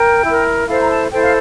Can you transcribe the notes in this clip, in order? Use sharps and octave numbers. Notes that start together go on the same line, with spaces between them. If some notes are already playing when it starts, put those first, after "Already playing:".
Already playing: A#4 G5
E4 A#4
E4 A4 C5 F5
A#5
A5
E4 A4 C5 G5
F5